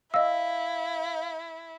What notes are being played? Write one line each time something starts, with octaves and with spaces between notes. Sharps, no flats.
E4 D#5 F5 E6